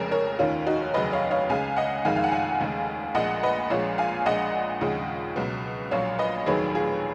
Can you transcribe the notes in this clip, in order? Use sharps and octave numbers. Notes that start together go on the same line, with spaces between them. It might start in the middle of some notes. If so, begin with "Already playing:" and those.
Already playing: F1 F2 C#3 G#3 A#4 C#5
A#4 C#5
F1 D#2 D#3 C#4 F4
D#4 F#4
F1 D#2 C#3 F#3 B4 D#5
C#5 F5
C#5 F5
C#2 C#3 G#3 F5 G#5
D#5 F#5
F#1 F2 D#3 G#3 F5 G#5
F5
F#5
F5 G#5
F1 D#2 C#3 G#3
A#1 A#2 G#3 D#5 F#5
B4 D#5
A#1 A#2 F3 G#3 C#5 F5
F5 G#5
A#1 A#2 G#3 D#5 F#5
D#2 C#3 F3 G#3
C#2 B2 F#3
A#1 A#2 F#3 C#5 F5
B4 D#5
F1 D#2 D#3 F#3 G#4 B4
F4 G#4